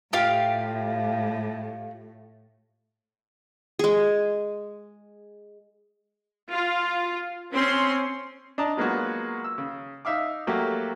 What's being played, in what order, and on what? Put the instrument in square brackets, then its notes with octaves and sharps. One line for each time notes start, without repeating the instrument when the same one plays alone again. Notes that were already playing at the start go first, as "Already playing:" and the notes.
[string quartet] A2 [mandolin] F4 G4 F5
[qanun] G#3 G#4
[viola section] F4
C4 C#4 C6
[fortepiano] D4 D#5 A5 A#5
F#3 G#3 A#3 B3 F4 F#4
E6
C#3
D#4 E5 F5 D6
F#3 G3 A3 A#3 F#4 G4